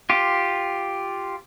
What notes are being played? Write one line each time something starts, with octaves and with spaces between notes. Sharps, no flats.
F4 G4